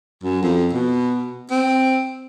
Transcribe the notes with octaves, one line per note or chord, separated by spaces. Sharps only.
F#2
F2
B2
C4